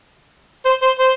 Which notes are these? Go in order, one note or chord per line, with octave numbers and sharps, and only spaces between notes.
C5
C5
C5